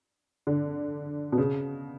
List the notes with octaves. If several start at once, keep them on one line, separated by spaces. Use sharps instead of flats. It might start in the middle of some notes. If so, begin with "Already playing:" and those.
D3
B2
C#3